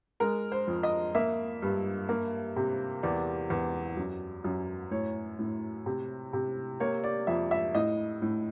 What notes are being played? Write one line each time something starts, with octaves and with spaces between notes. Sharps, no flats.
G#3 A#4
C5
F2
D#5
A#3 E5
G2
A#3
C3
E2 D5
E2
F#2
F#2
A2 C#5
A2
C3
C3
A#3 C#5
D5
F2 E5
E5
A2 D#5
A2